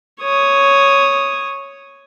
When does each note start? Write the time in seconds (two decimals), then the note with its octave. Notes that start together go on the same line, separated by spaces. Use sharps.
0.21 C#5 D#6